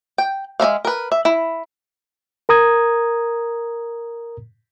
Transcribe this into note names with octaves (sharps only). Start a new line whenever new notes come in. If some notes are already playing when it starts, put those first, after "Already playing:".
G5
G#3 C#4 E5 F5
A#4 B4
E5
E4
A#4 A#5 D#6 G#6